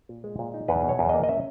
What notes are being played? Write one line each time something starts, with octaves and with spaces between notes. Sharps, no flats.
A#2
G#3
A#2
D#4
E2 B4
B2
C#5
E2
A#3 D#5
D#5
C#4 E5